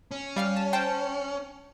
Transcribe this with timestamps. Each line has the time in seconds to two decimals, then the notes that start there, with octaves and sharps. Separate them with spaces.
0.11 C#4
0.36 G3 F5 F6
0.56 A5
0.73 C5 G5 A5